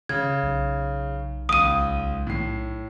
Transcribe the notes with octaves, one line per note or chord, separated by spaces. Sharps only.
C#3 G#6
B1
C#2 D#6 D#7
A2 C7